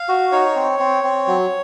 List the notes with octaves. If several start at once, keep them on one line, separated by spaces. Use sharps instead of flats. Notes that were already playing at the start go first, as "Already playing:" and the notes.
Already playing: F5
F#4
D#4 C#5
C4
C4
C4
F#3